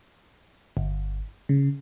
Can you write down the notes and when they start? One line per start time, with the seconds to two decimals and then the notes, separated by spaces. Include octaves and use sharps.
0.77 G1
1.49 C#3